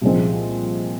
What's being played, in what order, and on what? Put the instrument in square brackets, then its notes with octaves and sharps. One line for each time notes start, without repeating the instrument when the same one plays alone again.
[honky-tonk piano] C2 A#2 F3 G#3 C4